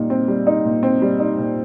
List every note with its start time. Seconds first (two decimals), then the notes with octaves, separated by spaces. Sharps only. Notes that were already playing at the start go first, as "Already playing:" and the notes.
Already playing: A#2 G3 D#4
0.10 C4
0.28 G3
0.47 D#4
0.65 A#2
0.83 C4
1.02 G3
1.19 D#4
1.38 A#2